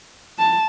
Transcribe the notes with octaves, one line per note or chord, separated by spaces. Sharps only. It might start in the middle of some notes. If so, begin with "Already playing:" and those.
A5